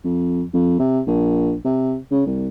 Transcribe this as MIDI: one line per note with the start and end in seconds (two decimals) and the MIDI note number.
0.04 0.43 41
0.54 0.76 41
0.79 1.01 48
1.07 1.55 34
1.65 1.98 48
2.12 2.22 49
2.26 2.48 36